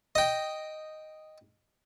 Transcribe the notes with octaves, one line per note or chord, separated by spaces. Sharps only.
D#5 G5